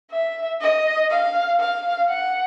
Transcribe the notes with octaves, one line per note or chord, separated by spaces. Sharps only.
E5
D#5
F5
F5
F#5